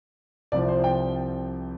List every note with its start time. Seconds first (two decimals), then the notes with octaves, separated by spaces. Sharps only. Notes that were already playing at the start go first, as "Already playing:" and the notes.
0.52 C2 C3 F3 C4 D5
0.68 C5
0.84 G5